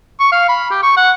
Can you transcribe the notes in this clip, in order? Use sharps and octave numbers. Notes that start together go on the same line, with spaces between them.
C#6
F5
B5
G4
C#6
F#5